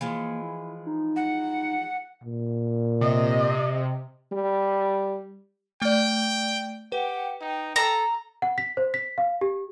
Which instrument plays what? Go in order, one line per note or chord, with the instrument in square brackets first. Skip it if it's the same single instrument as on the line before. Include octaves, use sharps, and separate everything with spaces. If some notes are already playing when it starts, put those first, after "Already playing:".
[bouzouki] E3 F3 G#3 [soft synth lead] A#3
[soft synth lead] E4
D#4
[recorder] F#5
[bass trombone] A#2
[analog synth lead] C3 [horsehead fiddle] D#5
[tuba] G3
[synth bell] A3 D5 [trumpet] G5
[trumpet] G4 [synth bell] B4 [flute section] F#5 G5
[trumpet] D#4 [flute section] G5
[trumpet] A4 [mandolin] A#5
[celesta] F#5
B6
C5
B6
F5
G4